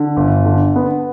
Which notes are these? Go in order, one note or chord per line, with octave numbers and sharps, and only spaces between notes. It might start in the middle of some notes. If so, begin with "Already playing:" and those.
Already playing: D3
G1
D3
B3